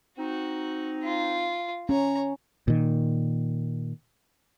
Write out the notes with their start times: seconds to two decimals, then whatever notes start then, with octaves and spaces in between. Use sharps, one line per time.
0.18 C4 D#4 F#4
1.04 F4
1.89 C#4 C#5 A#5
2.68 A#2 D#3